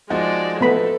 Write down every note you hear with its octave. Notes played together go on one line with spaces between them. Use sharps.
F3 G#3 D#4 F#4 D5
A3 B3 A4 B5